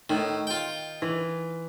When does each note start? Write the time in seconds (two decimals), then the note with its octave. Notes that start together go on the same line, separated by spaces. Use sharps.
0.10 A2 D#3
0.47 F4 G5
1.02 E3